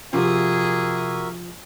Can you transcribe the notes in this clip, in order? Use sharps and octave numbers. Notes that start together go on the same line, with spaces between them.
C3 F3 F#4 G#4 A#4 E5